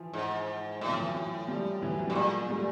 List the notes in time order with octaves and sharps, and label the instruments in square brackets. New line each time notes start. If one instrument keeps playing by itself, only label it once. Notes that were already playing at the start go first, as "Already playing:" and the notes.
Already playing: [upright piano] E3 F3
[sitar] G#2
[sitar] A2 [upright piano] F#3
[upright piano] F3
E3 F#3
E3 F#3
F3 G3
E3 F#3
F#3
[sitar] A2 [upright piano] G3
[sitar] A#2 [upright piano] F#3 G#3
[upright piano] G#3
G3 A3